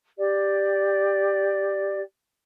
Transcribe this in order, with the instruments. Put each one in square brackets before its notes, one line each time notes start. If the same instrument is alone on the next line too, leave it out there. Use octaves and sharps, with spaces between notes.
[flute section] G4 D5